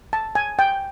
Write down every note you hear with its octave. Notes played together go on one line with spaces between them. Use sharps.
A5
G#5
G5